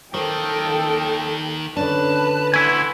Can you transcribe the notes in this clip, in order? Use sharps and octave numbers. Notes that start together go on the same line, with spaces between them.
D#2 D#3 A4 A#4 C5 G5
D3 C#4 D4 B4 A5
D2 E4 G#5